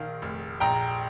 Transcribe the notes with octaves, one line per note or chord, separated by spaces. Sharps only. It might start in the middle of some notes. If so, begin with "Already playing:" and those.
Already playing: A#1 D#3 F5
F1
A#1 G5 A#5